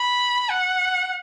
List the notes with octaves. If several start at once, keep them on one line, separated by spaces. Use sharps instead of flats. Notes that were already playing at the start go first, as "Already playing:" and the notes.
Already playing: B5
F#5